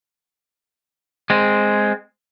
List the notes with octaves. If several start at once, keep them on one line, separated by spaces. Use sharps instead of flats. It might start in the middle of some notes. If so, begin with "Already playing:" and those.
G#3 C4